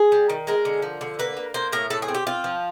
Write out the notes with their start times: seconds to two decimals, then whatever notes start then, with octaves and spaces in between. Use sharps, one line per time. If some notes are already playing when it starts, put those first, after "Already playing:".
Already playing: G#4
0.12 G3
0.30 D#3
0.47 G#3 A#4
0.65 D3
0.82 F3
1.01 D3
1.19 A#3 B4
1.37 A#3
1.54 A#3 C5
1.72 A2 A#4
1.90 A2 A4
2.02 G#4
2.08 C4
2.15 G4
2.27 C4 F4
2.44 F3